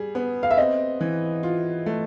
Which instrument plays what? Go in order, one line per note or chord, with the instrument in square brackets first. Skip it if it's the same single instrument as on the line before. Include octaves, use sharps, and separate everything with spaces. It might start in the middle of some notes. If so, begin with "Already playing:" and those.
Already playing: [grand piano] G3 G#4
B3
[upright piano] F5
E5
[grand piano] C4 [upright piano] D#5
[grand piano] E3
F4
A3